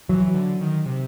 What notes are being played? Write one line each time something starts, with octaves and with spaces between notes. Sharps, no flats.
E3 F#3
D3
D#3
C3